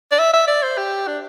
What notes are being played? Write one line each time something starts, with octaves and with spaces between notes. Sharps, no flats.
D5
E5
E5
D5
C5
G4
D4